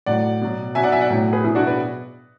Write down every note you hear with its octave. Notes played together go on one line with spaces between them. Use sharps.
A2 F#3 D5 F#5
B2 F#3
B2 F#3 E5 G#5
D5 F#5
E5 G#5
D5 F#5
A2 F#3
G#4 B4
B2 F#3 E4 G#4
D4 F#4
B4 D5